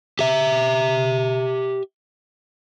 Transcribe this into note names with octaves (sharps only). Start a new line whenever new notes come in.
G4 E5